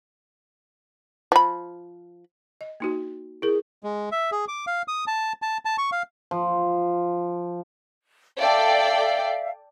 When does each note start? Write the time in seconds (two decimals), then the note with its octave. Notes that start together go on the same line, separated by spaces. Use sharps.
1.32 F3 B5
2.61 D#5
2.80 A#3 D#4 F#4
3.42 E4 G#4 A#4
3.84 G#3
4.12 E5
4.32 G#4
4.48 D6
4.67 F5
4.88 D#6
5.07 A5
5.42 A5
5.65 A5
5.78 C#6
5.92 F5
6.31 F3
8.39 A4 D5 E5 F5 G5